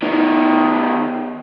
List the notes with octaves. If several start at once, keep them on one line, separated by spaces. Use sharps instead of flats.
D#3 B3